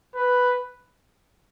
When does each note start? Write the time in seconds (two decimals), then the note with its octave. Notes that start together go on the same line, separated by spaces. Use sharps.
0.15 B4